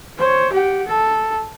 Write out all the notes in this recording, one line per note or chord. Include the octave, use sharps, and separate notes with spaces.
C5 C#5
G4 F#5
A4